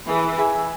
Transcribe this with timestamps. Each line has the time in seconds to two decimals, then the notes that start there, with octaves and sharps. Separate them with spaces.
0.08 E3 G#4 B4 E5
0.38 G#4 E5 B5